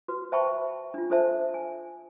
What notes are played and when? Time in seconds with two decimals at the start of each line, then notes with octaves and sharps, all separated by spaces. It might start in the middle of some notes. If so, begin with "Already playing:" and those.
0.08 F#4 B4
0.32 C5 E5 G5 A5 B5 C#6
0.94 D4 F4
1.10 D4 F4 A4 C5 E5 A5
1.54 G#5